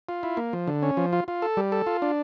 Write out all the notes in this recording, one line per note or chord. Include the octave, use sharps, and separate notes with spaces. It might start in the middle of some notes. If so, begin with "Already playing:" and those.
F4
E4
A#3
F3
D3
C#4
F3
F4
F4
A4
G3
A4
F4
D4